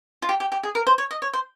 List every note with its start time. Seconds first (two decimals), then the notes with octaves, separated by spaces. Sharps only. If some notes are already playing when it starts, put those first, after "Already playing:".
0.22 F4
0.29 G4
0.40 G4
0.52 G4
0.63 G#4
0.75 A#4
0.87 C5
0.98 C#5
1.11 D#5
1.22 C#5
1.33 C5